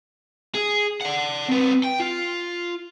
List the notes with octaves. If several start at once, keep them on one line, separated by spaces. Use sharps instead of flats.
G#4
D5 F#5
C4 B4
G5
F4